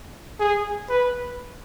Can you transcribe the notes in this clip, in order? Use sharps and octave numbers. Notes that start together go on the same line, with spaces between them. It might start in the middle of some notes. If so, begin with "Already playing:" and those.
G#4
B4